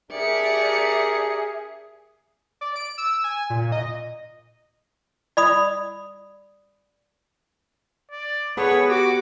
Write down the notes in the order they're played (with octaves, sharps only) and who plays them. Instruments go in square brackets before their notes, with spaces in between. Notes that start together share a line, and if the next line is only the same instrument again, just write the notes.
[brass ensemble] D4 A#4 [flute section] G4 E5 [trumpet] G#4 [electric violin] D5 C#7
[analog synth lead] D5
D7
E6
G#5
A#2
D#5
[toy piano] D5 B5 D#6
[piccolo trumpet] D5
[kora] B3 A4 [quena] G#4 [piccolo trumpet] B4 [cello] C#5
[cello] F#4 [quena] G4 [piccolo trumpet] D6